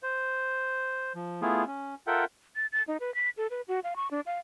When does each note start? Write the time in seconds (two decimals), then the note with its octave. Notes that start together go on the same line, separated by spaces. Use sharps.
0.03 C5
1.15 F3
1.42 A3 B3 E4 F4 G#4
1.67 C#4
2.07 F4 A4 A#4 E5 F#5 G5
2.56 A6
2.72 A6
2.88 D#4
3.00 B4
3.15 B6
3.37 A4
3.51 B4
3.68 F#4
3.84 F5
3.96 C#6
4.11 D4
4.26 F5